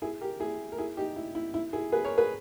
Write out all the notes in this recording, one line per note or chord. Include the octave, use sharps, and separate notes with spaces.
E4 G#4
G4 A#4
E4 G#4
A#4
E4 G#4
D#4 G4
E4
E4
E4
E4 G#4
G#4 B4
A#4 C#5
G#4 B4